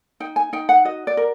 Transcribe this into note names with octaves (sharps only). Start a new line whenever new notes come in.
D#4 G5
G#5
D#4 G5
F#5
F#4 D#5
D5
A#4